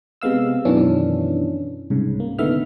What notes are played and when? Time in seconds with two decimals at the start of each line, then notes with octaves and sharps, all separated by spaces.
0.22 C3 G#3 B3 F5 E6
0.65 F#2 B2 D#3 E3 C#4 D4
1.90 C2 G#2 C#3
2.20 A#3
2.39 D3 D#3 A3 B3 E5 F6